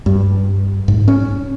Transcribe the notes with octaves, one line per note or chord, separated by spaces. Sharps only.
G2
G#2
C#4